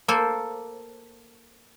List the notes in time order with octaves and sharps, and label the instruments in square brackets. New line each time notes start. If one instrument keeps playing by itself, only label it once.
[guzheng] A#3 A4 C5